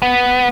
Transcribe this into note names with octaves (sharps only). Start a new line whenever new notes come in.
B3